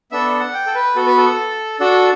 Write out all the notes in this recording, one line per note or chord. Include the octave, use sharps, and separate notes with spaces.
B3 D4 A4 E5
F#5
G5
A4
B4
B3 F#4 A4
B4
A4
D4 F#4 A4